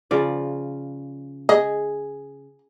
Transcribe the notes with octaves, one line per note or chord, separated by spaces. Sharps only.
C#3 F3 D5
G#4 D#5